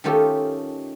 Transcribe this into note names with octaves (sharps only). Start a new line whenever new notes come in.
D#3 A3 C#4 F4 G4 A4